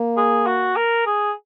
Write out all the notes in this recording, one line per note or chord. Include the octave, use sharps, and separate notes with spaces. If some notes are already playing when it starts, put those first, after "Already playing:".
Already playing: A#3
G#4
F#4
A#4
G#4